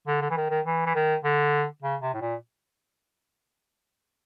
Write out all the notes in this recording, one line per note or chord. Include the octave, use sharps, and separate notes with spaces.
D3
D3
E3
D#3
D#3
E3
E3
D#3
D3
C#3
C3
A2
A#2